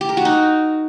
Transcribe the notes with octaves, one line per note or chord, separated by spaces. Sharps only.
G4
A#4
F#4
D#4